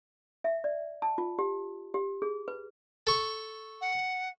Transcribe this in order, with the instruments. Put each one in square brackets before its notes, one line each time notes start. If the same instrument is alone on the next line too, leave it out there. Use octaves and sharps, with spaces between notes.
[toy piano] E5
D5
A5
F4
G4
G4
G#4
B4
[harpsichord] A4 C#6
[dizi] F#5